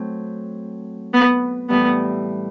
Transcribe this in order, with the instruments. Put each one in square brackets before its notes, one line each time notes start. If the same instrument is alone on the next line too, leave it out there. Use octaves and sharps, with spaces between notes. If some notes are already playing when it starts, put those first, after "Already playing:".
Already playing: [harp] F#3 A3 C4
[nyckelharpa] B3
[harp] A2 E3 G3 [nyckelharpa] B3